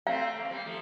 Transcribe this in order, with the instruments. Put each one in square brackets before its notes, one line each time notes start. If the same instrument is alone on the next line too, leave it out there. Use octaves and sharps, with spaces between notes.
[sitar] A3 C4 [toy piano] F5
[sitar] A#3
C4
G3 A#3
F3 A3